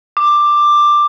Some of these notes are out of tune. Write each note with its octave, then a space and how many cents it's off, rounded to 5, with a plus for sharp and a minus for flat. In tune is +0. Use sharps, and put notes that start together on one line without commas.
D6 +10